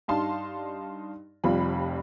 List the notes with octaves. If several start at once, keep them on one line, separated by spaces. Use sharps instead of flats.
G2 D4 D#4 F5 A5 C6
F1 F2 G3 F4 B5